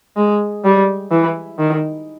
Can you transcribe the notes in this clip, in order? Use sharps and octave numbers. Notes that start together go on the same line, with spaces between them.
G#3
G3
E3
D#3